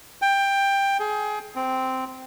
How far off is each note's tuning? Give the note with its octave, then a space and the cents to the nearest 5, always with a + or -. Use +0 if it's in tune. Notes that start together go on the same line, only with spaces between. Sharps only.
G5 +15
G#4 +25
C4 -10